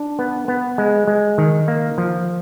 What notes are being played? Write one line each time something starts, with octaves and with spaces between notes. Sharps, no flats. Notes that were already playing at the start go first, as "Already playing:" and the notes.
Already playing: D4
B3
B3
G#3
G#3
D#3
A#3
F3